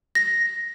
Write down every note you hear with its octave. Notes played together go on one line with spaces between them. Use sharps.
A#6